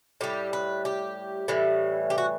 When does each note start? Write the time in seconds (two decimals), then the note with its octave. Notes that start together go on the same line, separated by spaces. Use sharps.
0.21 A2 G3 G4
0.53 B4
0.85 G4
1.48 A2 E3 G3
2.10 G4
2.18 F#4